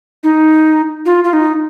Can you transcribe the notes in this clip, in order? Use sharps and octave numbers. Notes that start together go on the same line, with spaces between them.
D#4
F4
F4
D#4